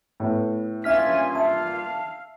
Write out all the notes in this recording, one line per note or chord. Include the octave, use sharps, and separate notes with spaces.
A2 A3 B3
G2 A#3 C#4 F4 E5 G#5 F6 B6
E5 F5 A5